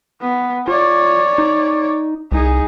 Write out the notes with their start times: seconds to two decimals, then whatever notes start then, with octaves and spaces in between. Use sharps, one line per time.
0.21 B3
0.68 F4 C#5 D5
1.38 D#4
2.32 C2 D#4 G#4